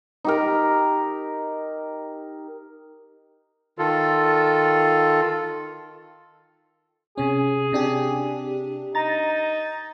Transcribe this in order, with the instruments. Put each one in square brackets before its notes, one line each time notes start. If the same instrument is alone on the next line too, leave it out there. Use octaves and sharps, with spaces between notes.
[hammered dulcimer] D#4 G4 A#4
[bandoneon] D#3 F4 A4
[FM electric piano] C3 C#4 [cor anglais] G#4
[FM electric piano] C3 D4 G4
[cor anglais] D#4 [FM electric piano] A#5 A6